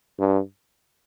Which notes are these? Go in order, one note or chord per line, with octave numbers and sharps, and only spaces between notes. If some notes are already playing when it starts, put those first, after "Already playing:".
G2